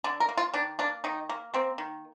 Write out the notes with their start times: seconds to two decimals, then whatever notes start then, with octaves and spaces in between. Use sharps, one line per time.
0.04 D3 D4
0.20 A#4
0.29 A#3
0.37 F4
0.54 D#3 D4
0.79 A#3 D4
1.04 D#3 D#4
1.29 A#3
1.54 A#3 C4
1.78 D#3